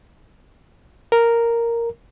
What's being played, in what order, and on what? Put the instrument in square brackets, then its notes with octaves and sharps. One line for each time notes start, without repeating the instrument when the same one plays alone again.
[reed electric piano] A#4